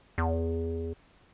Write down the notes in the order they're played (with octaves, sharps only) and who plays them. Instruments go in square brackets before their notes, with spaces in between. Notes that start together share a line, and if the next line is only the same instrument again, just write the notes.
[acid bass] E2